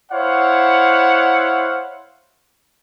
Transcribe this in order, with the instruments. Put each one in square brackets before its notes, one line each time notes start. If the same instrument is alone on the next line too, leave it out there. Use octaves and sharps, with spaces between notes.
[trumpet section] E4 C5 C#5 F5 F#5